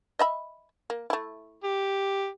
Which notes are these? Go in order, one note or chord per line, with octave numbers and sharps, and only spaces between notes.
D#5 E5 B5
A#3
A3 E4
G4